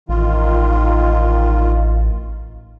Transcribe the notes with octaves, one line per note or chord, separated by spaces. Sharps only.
A1 D#3 F4